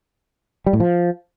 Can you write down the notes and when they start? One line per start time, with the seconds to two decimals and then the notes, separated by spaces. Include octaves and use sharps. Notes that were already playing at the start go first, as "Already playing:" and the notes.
0.67 G3
0.73 A2
0.80 F3